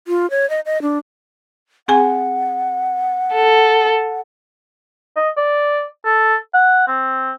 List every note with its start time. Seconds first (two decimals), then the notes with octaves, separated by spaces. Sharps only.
0.08 F4
0.31 C#5
0.50 D#5
0.66 D#5
0.82 D4
1.88 C4 G#4 F#5 G#5
3.33 A4
5.16 D#5
5.37 D5
6.05 A4
6.54 F#5
6.88 C4